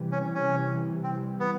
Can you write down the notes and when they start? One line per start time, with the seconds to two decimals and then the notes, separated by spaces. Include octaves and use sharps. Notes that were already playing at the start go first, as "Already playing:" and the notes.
Already playing: C3 E3 G3
0.12 C#4
0.35 C#4
1.04 C4
1.40 B3